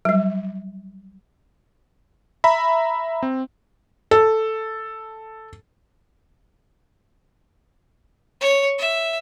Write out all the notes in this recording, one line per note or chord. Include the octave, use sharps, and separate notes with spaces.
F#3 G3
E5 A#5 B5
C4
A4
C#5
E5